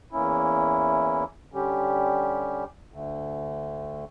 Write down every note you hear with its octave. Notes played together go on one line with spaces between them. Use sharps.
E2 E3 A#3 C#4 E4
D3 G3 C#4 G4
D2 D3 A3